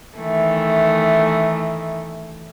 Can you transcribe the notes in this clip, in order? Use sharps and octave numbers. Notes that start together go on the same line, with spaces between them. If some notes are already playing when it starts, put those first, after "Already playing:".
D#3 E3 A3